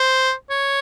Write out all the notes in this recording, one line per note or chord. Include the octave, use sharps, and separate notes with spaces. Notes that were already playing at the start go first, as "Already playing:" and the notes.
Already playing: C5
C#5